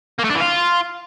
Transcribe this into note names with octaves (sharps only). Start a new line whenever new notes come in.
A#3
A3
D4
E3
F4